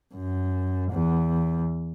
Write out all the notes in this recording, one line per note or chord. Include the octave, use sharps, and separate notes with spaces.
F#2
E2